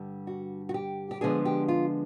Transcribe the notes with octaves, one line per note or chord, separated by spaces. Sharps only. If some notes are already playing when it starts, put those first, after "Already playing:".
Already playing: G2 D3 G3
F#4
F#4
G4
G4
D3 F3 G#3 B3 D4 G#4
G4
F4